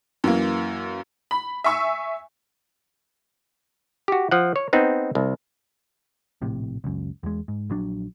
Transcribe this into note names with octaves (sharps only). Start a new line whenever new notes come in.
F#2 E3 A#3
B5
E5 G#5 C#6 E6
F#4 G4
F3 F#5
C#5
B3 C4 D#4
C2
A#1 A2 C3
C#2 F#2
E2 G#3
G#2
A#1 F#3 D4